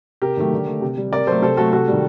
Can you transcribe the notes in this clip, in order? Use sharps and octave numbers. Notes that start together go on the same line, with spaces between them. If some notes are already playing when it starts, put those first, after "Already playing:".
C3 G4 A#4
D#3 F#3 A3
D3
A3
C3
G3
C3 A#4 D5
F#3 A3 A4 C5
C3 A4 C5
F#3 A3 F#4 A4
C3 F#4 A4
D#3 G3